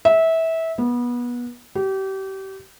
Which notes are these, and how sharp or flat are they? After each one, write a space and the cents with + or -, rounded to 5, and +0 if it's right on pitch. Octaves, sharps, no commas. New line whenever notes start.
E5 -20
B3 -25
G4 -30